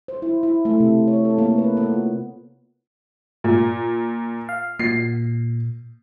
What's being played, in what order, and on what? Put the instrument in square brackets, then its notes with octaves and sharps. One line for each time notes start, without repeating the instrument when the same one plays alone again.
[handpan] C5
E4
E4
A3
C3
C#5
A4
A#3
B4
B3
F4
[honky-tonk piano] A#2
[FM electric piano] F5
[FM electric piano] A#2 [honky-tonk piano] C7